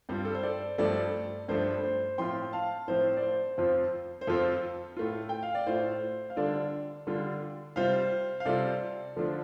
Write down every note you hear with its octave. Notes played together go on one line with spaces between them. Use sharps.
G2 G3 C4 F4 C5
A4
C5
A4 D5
G2 F3 A3 D4 A4 D5
G2 F3 A3 D4 C5
C5
A2 F3 C4 F4 G5 C6
F5 A5
A2 F3 C4 F4 C5 F5
D5
C5
F2 F3 C4 F4
C5
F2 F3 C4 F4 A4
A2 A3 F4
G5
F5
D5
A2 A3 F4 C5
F5
D3 G3 D4 F4 A4 D5
D3 G3 D4 F4
C3 G3 F4 C5 F5
F5
C3 G3 F4 A4 D5
D3 F3 A3 D4 F4